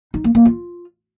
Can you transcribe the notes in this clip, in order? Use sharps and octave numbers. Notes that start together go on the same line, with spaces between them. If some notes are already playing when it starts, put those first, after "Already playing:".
D#4
A#3
A#3
F4